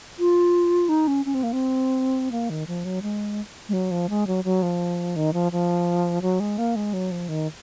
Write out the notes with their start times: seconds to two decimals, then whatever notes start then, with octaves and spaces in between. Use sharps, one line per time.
0.19 F4
0.89 D#4
1.08 C#4
1.26 C#4
1.34 C4
1.43 A#3
1.53 C4
2.32 A#3
2.50 D#3
2.67 F3
2.85 F#3
3.02 G#3
3.69 G#3
3.73 F#3
3.91 F3
4.10 G#3
4.27 F#3
4.44 F#3
4.62 F3
5.16 D#3
5.33 F3
5.52 F3
6.22 F#3
6.40 G#3
6.58 A#3
6.76 G#3
6.93 F#3
7.11 F3
7.29 D#3